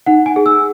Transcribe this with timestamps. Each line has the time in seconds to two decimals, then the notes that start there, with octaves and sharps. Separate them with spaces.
0.06 D#4 F#5
0.26 G#5
0.36 G#4
0.46 E6